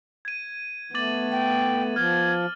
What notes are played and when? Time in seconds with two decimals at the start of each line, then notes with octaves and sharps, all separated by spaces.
0.25 G#6 D#7
0.95 A3 B3 D6 A6 F#7
1.32 G5
1.96 F3 F6 G#6